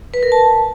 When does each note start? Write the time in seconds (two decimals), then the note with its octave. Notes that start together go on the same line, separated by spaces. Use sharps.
0.14 B4
0.23 A#4
0.32 A5